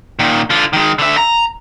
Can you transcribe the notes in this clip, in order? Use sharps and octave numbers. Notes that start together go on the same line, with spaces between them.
A#2 D#3
D3 F4
D#3 G#3
D3 E5
A#5